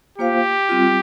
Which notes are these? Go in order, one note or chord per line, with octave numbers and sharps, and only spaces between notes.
A#3 F4 G4 C5 F5
G3 C4 F4